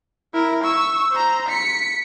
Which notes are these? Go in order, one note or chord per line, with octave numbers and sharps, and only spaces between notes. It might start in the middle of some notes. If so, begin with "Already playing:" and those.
E4 A#4
C#6 E6
C5 A#5
B6 C#7